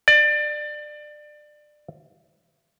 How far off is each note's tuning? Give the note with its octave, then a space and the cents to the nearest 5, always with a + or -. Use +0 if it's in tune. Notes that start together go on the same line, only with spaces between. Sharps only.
D5 +25